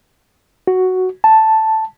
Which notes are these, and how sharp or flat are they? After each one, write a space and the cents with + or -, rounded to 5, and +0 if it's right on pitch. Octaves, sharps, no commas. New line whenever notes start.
F#4 +5
A5 +0